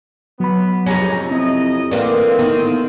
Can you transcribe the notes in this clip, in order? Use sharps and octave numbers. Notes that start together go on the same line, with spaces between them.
F#3 B3 B5
G1 F2 C3 G#3 C#4 A#5
C4 E4 D#5
A2 D3 E3 A#3 C4 D5 F5
D#3 B3